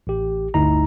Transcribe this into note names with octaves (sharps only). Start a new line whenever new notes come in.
A1 G4
G1 D2 D#4 E4 A#5